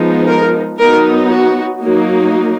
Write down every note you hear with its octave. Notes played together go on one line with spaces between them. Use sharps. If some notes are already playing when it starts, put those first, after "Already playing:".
Already playing: F3 G#3 B3 D#4
A#4
F#3 B3 D#4 A#4
F#4
F#3 A#3 D#4